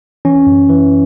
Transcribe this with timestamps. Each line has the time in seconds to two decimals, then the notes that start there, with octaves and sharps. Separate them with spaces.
0.25 E3 C#4
0.47 F#2
0.69 E3